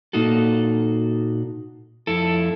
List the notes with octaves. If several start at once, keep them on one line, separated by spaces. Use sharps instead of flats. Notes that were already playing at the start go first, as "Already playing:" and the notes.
A#2 A#3 D#4 F#4 A4
F2 E4 A4